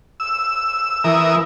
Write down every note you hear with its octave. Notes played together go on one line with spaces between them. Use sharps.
E6
E3 A#4 E5 D#6